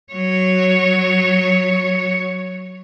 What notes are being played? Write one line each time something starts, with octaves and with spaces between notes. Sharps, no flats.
F#3 C#5